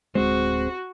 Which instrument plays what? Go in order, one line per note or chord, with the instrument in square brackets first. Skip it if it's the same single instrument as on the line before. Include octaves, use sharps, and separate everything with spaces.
[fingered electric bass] D1 G#3 [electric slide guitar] C4 G#4 C5 [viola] F#4